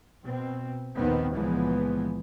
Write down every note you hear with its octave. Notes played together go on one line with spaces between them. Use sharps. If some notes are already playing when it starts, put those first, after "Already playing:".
B2 C4
A#1 D#2 D#3 B3 C4
C#2 A#2 E3 F3 G#3 B3